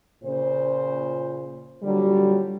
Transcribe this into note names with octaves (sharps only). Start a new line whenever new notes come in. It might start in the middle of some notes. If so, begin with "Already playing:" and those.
A#2 C#3 C5
A#2 D3 F#3 G3